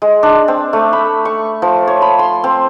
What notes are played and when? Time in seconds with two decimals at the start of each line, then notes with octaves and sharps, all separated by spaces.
0.02 G#3
0.23 D4
0.48 C4
0.73 A3
0.93 B5
1.25 C#6
1.62 F3
1.88 C#5
2.02 B5
2.19 C6
2.44 C4